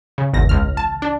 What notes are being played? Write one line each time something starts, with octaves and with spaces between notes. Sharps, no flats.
C#3
G#1 E2 A#6
C#2 F6
A5
D4